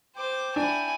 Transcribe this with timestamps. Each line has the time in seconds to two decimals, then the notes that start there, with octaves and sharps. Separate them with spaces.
0.16 C5 G5 D6
0.56 D4 E4 G#5